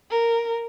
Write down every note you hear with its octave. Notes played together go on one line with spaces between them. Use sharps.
A#4